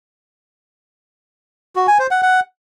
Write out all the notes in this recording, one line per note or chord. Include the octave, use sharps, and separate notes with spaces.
F#4
G#5
C5
F#5
F#5